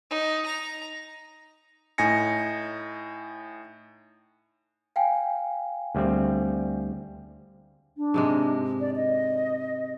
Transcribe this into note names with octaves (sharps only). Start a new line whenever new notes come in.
D#4
A#5
A2 D#4 G#5 A#6 C#7
F5 G5 G#5
D2 G3 C4
D4
G#2 C3 G#3
D5
D#5